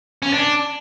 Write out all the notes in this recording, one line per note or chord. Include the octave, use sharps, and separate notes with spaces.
C#4
D4